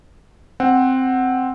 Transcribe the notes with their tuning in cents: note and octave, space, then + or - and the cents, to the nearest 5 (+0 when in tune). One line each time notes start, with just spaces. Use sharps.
C4 +0 F#5 +5